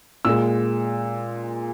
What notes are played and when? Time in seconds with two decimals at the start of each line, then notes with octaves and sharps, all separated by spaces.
0.25 A#2 G#3 E6